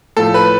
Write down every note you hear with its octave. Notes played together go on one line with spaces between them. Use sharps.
A2 F3 A4
B4